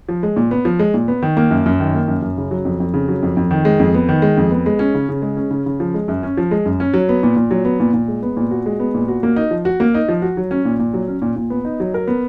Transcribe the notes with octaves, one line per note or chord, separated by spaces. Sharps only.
F3
G#3
A#2
B3
F3
G#3
A#2
B3
D#3
A#3
F#2
F#2
D#3
A#3
F#2
F#2
C#3
F#3
F2
F2
C#3
F#3
F2
F2
D#3
G#3
F2
B3
D#3
G#3
F2
B3
G#3
C#4
C#3
C#3
G#3
C#4
C#3
C#3
F3
G#3
F#2
C#4
F3
G#3
F#2
C#4
F#3
B3
A#2
A#2
F#3
B3
A#2
A#2
G#3
B3
A#2
F#4
G#3
B3
A#2
F#4
A#3
D#4
F3
F#4
A#3
D#4
F3
F#4
F#3
C#4
A#2
A#2
F#3
C#4
A#2
A#2
B3
D#4
F#3
A#4
B3